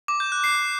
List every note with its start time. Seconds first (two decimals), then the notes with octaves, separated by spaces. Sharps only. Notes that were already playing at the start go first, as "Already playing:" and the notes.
0.08 D6
0.20 G6
0.32 F#6
0.44 C7